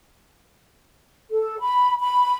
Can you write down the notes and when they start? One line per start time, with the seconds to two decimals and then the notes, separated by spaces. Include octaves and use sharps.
1.29 A4
1.59 B5
2.00 B5